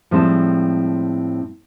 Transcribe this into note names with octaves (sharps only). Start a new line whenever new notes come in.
A2 F3 G3 G#3 C4 A5